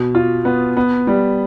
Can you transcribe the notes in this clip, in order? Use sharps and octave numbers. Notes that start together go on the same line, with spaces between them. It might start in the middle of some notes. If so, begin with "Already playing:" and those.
Already playing: B2
F4
B3
B3
G3